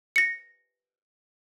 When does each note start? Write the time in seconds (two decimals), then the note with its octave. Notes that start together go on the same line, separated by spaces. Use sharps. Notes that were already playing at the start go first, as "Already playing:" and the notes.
0.16 A#6 C#7